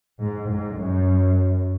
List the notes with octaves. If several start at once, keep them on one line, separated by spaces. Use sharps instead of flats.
G#2
G#2
F#2